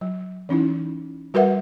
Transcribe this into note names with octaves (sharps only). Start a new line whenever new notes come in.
F#3
E3 C#4 D#4 E4
G3 F#4 A#4 B4 E5 F#5